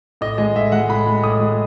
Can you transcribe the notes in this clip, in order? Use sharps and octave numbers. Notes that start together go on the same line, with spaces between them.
A2 D#5
G#3 D#5
A2 E5
G#3 F#5
A2 B5
G#3
A2 D#6
G#3